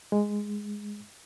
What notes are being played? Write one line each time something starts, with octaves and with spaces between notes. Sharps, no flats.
G#3